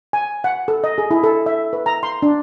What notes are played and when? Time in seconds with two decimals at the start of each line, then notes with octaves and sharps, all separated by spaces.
0.13 G#5
0.44 F#5
0.68 A4
0.84 D#5
0.98 G#4
1.11 E4
1.24 A4
1.46 E5
1.73 B4
1.86 A#5
2.03 C6
2.23 D4